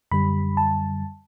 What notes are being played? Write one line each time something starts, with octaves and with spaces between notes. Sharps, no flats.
F#2 D3 G3 B5
A5